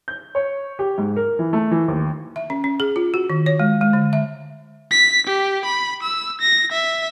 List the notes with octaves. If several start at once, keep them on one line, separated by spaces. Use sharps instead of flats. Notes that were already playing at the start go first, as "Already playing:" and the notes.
G6
C#5
G4
G#2
A#4
E3
A3
E3
D#2
E5
C#4
C#4
G#4
F4
F#4
D#3
C#5
G#3
G#3
D3
E5
B6
G4
B5
E6
A#6
E5